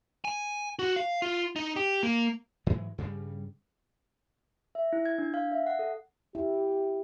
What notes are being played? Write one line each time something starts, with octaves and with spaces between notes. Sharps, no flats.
G#5
F#4
F5
F4
D#4
G4
A#3
G#2 E3 F#3 G#3
G2 C#3 G3
E5
E4
G#6
D4
F5
E5
F#5
A4
E4 G4